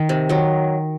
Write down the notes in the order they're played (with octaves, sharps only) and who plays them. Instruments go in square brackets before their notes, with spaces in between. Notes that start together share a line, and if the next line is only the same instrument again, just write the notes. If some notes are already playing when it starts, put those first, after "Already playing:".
Already playing: [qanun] D#3
C3
D#3 F#3